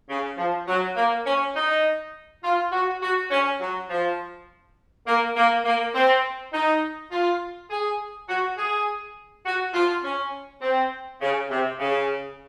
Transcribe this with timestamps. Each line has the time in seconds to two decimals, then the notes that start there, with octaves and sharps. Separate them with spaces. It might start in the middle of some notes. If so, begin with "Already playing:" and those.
0.09 C#3
0.38 F3
0.68 F#3
0.96 A#3
1.25 C#4
1.55 D#4
2.43 F4
2.72 F#4
3.01 F#4
3.30 C#4
3.60 F#3
3.90 F3
5.06 A#3
5.36 A#3
5.65 A#3
5.94 C4
6.53 D#4
7.12 F4
7.70 G#4
8.28 F#4
8.58 G#4
9.45 F#4
9.74 F4
10.03 C#4
10.62 C4
11.21 C#3
11.50 C3
11.79 C#3